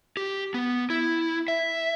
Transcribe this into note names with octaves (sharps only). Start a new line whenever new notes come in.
G4
B3
E4
E5